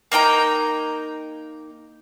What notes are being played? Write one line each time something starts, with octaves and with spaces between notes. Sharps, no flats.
A#3 D#4 G5 A#5